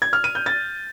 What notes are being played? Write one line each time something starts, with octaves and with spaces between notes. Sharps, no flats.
G#6
F6
D#7
G6
A6